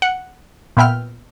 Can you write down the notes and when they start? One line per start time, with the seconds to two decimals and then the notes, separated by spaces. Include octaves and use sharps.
0.02 F#5
0.77 A#2 B3 E5 G5 F6